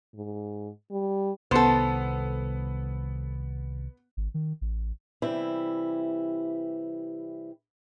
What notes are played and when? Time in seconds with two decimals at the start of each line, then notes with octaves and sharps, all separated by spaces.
0.15 G#2
0.91 G3
1.51 C2 D#3 B3 A4 C5
4.17 G#1
4.34 D#3
4.61 A1
5.22 C3 E3 G3 E4